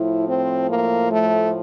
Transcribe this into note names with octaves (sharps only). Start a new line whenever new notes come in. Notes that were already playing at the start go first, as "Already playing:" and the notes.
Already playing: A2 F3 E4
C4
A#3
A3